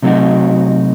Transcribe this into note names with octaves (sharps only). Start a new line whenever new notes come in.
C3 F#3 A3 D#4 F#4